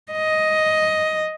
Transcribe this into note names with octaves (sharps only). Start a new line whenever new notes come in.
D#5